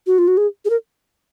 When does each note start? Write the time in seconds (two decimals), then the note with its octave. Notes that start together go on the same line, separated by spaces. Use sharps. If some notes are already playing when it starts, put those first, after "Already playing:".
0.06 F#4
0.18 F4
0.27 F#4
0.37 G#4
0.65 G#4
0.70 A#4